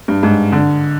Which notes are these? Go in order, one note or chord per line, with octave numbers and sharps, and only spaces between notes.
G2
G#2
D3